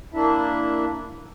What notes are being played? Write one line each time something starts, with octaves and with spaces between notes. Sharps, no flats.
A#3 D4 E4 E5